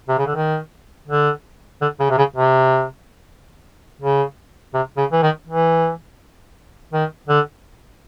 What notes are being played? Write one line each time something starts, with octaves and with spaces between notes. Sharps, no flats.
C3
C#3
D3
D#3
D3
D3
C#3
C3
C#3
C3
C#3
C3
C#3
E3
D#3
E3
D#3
D3